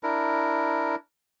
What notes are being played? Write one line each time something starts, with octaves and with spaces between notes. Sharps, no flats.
D4 E4 A#4